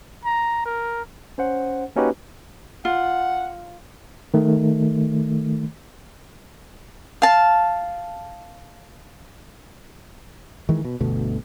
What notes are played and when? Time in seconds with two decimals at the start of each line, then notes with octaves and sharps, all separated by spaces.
0.25 A#5
0.65 A#4
1.38 C#4 C5 F#5
1.96 A#3 C#4 D#4 F#4 G4 B4
2.85 F4 F#5
4.34 D#3 A3
7.22 F5 A5
10.69 D#3 E3 G#3
10.85 B2
11.01 G1 D2 B2 A3